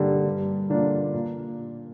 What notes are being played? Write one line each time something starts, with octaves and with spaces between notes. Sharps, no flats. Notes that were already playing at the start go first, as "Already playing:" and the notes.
Already playing: G2 D3 G3 A#3
G2
D3 A#3 D4 F4
A#2